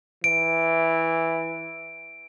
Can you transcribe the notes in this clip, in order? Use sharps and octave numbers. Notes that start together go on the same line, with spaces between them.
E3 D7